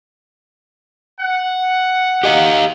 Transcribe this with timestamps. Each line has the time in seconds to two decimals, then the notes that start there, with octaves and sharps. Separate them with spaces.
1.20 F#5
2.24 G4 D#5 F5